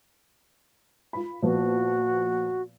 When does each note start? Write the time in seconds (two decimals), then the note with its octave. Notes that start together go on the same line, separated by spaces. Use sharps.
1.13 F4 B5
1.42 A#2 F3 B3 F#4